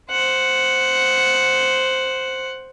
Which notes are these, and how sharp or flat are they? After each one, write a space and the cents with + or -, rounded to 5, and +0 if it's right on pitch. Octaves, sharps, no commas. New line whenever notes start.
C5 +0 F#5 +5